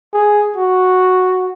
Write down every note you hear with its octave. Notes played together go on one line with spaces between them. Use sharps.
G#4
F#4